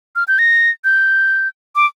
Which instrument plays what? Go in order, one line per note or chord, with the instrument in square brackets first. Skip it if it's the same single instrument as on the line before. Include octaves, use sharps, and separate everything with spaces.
[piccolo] F6
G6
A#6
G6
D6